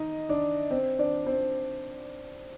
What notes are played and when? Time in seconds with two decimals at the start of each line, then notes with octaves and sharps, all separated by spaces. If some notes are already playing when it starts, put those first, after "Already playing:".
Already playing: D#4 D#5
0.29 D4 D5
0.71 C4 C5
0.99 D4 D5
1.26 C4 C5